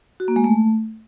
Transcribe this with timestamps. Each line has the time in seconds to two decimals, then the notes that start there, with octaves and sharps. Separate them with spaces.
0.20 F#4
0.28 A#3
0.36 G#3
0.44 A3